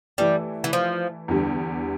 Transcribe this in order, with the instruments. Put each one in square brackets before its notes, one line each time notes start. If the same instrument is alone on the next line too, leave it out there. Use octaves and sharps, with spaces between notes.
[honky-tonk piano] E3 A3 E4 [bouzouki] G3
[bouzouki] E3
F3
[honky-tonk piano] E2 D3 G3